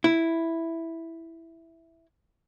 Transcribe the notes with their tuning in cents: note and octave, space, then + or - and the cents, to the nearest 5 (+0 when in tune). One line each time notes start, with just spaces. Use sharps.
E4 +0